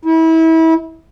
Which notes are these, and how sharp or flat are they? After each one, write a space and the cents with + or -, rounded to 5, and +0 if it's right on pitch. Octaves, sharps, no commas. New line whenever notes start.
E4 -30